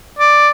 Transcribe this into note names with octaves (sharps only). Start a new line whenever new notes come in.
D5